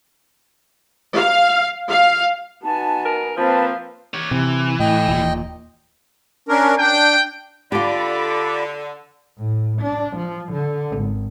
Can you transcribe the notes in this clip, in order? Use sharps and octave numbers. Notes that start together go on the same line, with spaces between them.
F5
F5
B3 D#4 F#4 G#5 A5
A#4
F3 A#3 C4 B4 F5 A5
G4 C#5
C3 E3
A2 D#5 G5
D#1 A#2
C#4 D4 A#4
D4 G5
D3 F4 G4 D5 B5 D6
A2
D4
F3
D3
G#1